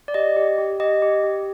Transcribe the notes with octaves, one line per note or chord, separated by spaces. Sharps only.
D5
G4 D#5
G4
G4
G4 D#5
G4
G4